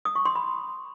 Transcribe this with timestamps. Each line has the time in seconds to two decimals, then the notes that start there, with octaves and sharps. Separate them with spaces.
0.05 D#6
0.15 C#6
0.25 C6
0.35 B5